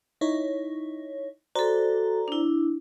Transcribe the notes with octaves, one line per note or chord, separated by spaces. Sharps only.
D#4 E4 C#5
F#4 A4 C5 D5 A#5
D4 E4